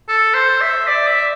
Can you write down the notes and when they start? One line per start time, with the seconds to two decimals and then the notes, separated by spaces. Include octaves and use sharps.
0.09 A4
0.34 C5
0.61 E5
0.88 D5
1.08 E5